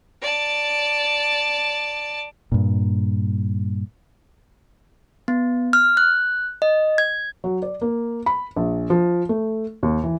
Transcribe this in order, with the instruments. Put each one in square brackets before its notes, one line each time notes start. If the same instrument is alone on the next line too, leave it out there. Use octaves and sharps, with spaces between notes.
[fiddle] D5 A5
[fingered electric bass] G2 A#2
[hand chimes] B3
F6
F#6
D#5
G#6
[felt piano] F#3
D5
A#3
B5
A#1
F3
A3
D#2
E3